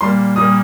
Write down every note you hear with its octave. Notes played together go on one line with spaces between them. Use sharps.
A#2 G3 A#3 C6
A#2 G3 A#3 D#6